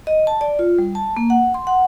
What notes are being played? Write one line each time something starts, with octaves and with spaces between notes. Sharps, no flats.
D#5
A5
D5
F4
G3
A5
A#3
F#5
C6
F#5